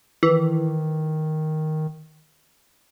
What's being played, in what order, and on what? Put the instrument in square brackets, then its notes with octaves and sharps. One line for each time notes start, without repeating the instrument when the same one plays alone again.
[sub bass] D#3 [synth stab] E3